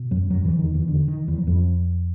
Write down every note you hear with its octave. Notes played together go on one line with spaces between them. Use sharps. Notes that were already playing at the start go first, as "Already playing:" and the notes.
Already playing: B2
F#2 F#3
F#2 F#3
E2 E3
D#3
E2 E3
D3
D#3
E2 E3
F#3
F2 F3